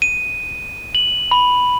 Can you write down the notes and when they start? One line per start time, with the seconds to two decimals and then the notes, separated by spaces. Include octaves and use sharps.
0.02 D#7
0.95 F#7
1.31 B5